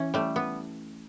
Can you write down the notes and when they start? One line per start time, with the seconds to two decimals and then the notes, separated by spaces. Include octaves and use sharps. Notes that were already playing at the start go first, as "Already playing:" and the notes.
Already playing: E3 C#4 E4
0.14 G3 A3
0.36 B3